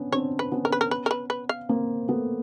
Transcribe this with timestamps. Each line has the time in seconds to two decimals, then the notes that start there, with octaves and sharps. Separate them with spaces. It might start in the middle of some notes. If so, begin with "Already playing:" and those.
Already playing: B3 C#4 D4
0.12 C4 D4 C#5
0.39 B4
0.51 B3 C#4
0.65 A#4
0.72 B4
0.81 A#4
0.91 B4
1.06 A#4
1.11 B4
1.30 B4
1.49 F5
1.69 A#3 C4
2.08 A3 B3